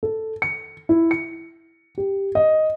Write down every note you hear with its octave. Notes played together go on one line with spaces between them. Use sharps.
A4
C#7
E4
C#7
G4
D#5